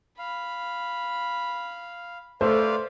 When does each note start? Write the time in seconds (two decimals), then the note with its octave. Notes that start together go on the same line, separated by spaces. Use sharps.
0.19 F5 B5
2.41 A3 B4 C5 D5 F5